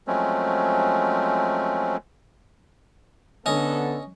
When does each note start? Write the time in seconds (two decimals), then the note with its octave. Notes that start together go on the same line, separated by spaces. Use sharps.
0.07 F3 F#3 G#3 A3 C4 C#4
3.46 D3 B3 C#4 A4 D#5